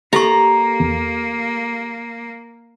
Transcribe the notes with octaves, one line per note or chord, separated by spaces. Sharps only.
A#3 G4 A4 A#5 C#6
E2